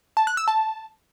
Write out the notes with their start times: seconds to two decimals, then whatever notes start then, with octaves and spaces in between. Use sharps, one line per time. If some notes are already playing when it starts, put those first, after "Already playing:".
0.17 A5
0.27 F#6
0.37 E6
0.48 A5